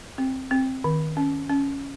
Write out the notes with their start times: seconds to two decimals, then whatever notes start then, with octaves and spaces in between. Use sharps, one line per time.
0.18 C4
0.51 C4
0.84 D#3
1.17 C#4
1.49 C#4